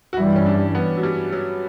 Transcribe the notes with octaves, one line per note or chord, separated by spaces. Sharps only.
F#4
G2 E3 G3 E4
C#4
D4
B3
F#3
G3
F#3